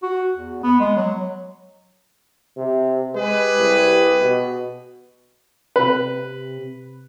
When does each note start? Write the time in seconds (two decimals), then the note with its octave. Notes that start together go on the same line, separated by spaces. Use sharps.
0.03 F#4
0.33 E2
0.64 B3
0.80 G#3
0.96 F#3
2.57 C3
3.15 G#3 G4 G#4 B4
3.58 C2
4.21 B2
5.76 C3 B4